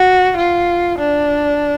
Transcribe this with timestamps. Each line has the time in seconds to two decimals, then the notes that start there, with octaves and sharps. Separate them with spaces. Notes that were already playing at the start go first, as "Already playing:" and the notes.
Already playing: F#4
0.37 F4
0.99 D4